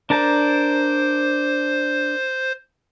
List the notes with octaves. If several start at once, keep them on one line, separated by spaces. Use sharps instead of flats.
D4 A#4 C5 A5